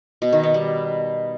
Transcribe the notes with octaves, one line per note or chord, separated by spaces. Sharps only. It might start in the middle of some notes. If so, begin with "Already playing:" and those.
B2
D#3
B3
G3